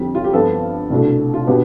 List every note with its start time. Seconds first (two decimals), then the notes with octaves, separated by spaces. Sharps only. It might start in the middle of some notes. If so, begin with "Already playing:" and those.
Already playing: F2 D3 G3 C4
0.15 F4
0.24 G4
0.33 G2 F3 B3 D4 A4
0.90 C2 B2 A3 D4
1.34 F4
1.47 B2 B3 D4 G4